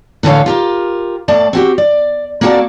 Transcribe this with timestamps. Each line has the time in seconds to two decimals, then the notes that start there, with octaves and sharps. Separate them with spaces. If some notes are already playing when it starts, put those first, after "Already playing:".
0.23 A2 D3 E3 A4 C#5 F5
0.46 F4 G4 A#4
1.28 A2 A3 D5 A5
1.53 C4 F#4 G4
1.78 D5
2.41 A#3 C4 F#4 G#4 A4 D5